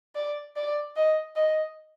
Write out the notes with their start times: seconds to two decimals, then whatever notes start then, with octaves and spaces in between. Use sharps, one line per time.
0.15 D5
0.56 D5
0.96 D#5
1.36 D#5